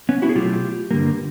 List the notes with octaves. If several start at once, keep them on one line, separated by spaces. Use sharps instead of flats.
B3 C#4
E4 F#4
G#4
B2 F#3 A3 F4 G4
G2 D3 G3 A#3